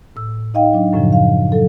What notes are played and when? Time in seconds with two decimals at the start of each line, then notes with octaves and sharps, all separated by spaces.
0.16 A2 E6
0.54 D#4 D#5 F5 G5
0.73 F#3 D4
0.93 F#2 A2 C#3 F3
1.13 F5
1.52 F#3 A4